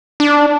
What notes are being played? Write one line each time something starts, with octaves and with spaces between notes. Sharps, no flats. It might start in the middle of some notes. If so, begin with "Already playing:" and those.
D4